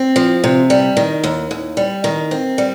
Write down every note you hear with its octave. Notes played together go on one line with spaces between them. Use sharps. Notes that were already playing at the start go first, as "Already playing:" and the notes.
Already playing: C4
F3
C3
G3
D#3
D#2
D#2
G3
D#3
C4
G3